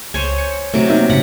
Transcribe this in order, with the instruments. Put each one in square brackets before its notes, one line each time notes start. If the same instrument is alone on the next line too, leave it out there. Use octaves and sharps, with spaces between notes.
[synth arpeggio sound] C#2 [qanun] C5 C#5 G#5
[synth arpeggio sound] C#7
[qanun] C3 F#3 [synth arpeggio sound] A3
[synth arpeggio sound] A#3 D#4 E5
[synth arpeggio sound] A2 C#3 B6 [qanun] F#5